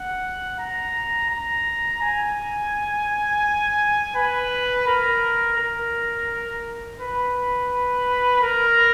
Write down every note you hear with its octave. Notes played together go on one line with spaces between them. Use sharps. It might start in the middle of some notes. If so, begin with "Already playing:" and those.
Already playing: F#5
A#5
A#5
G#5
B4
A#4
A#4
B4
A#4